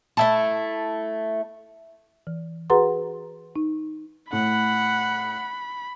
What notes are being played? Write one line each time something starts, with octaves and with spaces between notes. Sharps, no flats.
A3 E4 A5
E3
F#4 G#4 B4 F#5 A#5 C6
D#4
A2 F#5 B5